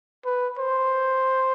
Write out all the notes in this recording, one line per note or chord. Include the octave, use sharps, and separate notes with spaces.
B4
C5